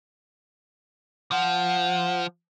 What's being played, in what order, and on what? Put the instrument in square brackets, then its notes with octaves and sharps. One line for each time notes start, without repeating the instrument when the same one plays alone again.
[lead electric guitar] F3 [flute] F#5